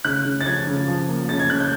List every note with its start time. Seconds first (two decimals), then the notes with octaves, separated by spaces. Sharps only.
0.05 C#3 F#6
0.25 C#3
0.41 A6
0.46 F3 G#6
0.67 C#3
0.88 F3
1.08 A#3
1.29 C#3 A6
1.39 G#6
1.50 C#3 F#6
1.60 G6